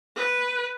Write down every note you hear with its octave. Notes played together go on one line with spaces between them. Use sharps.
B4